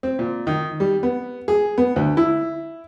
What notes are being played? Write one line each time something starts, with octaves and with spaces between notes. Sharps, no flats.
C4
A#2
D#3
G3
B3
G#4
B3
D2
E4